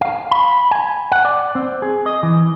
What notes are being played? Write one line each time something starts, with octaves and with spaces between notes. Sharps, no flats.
F5
B5
G#5
F#5
D5
C4
G#4
D#5
E3